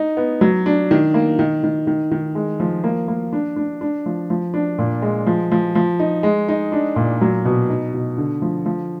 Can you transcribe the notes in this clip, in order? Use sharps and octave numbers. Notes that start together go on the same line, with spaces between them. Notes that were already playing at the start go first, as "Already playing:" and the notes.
Already playing: D#4
B3
F#3
D4
D#3
A#3
D#3
D#3
D#3
D#3
G#3
F3
A#3
A#3
D4
D4
D4
F3
F3
D4
A#2
G#3
F3
F3
F3
D#4
G#3
D#4
D4
A#2
F#3
B2
D#4
B2
D3
F3
F3